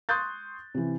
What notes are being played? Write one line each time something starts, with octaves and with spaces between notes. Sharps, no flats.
C6 C#6 D#6 F#6 G6 A6
C3 E3